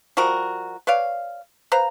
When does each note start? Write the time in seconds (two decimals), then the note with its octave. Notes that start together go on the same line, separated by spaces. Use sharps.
0.17 F3 G3 F#4 A#4
0.87 B4 C#5 D5 F5
1.72 B4 C5 F5 A#5